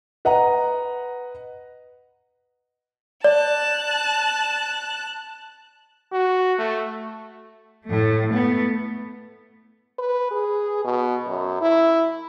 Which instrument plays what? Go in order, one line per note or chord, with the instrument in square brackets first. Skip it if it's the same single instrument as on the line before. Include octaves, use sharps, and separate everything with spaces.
[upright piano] B4 D#5 F#5 A#5
[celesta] D5 [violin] A5 F#6
[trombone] F#4
A3
[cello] A2 A3
A3 B3
[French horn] B4
G#4
B2
F#2
E4